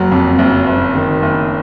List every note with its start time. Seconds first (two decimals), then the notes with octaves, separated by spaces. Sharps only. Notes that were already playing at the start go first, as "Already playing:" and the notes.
Already playing: F#1 F#3
0.12 F2
0.38 F#1
0.67 F#1
0.95 D#3
1.22 F#1